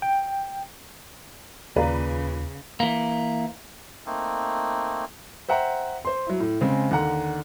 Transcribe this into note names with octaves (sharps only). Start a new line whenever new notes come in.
G5
D#2 A#2 C#3 B4 D5 F5 A#5
E3 A#3
A3 A#3 C4 D#4
C5 E5 F#5 G5 A#5
C5 C6
F#3 E4
A2
C#3 G#3 C4
D#2 D3 F#5 A#5